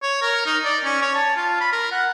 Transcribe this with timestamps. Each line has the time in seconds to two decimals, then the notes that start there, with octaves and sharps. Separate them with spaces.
0.02 C#5
0.22 A#4
0.46 D#4
0.65 D5
0.84 C#4
1.02 C#5
1.14 A5
1.37 F4
1.61 B5
1.73 A#4
1.92 F#5